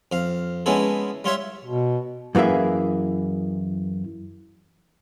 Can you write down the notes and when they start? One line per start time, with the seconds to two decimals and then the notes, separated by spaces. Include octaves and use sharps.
0.12 F2 F5
0.66 G#3 B3 C#4 E4 A4
1.24 G3 F4 C#5 E5
1.65 B2
2.35 F#2 E3 A#3 G#4 E5